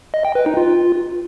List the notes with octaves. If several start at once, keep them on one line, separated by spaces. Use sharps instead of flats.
D#5
G5
B4
D#4
F4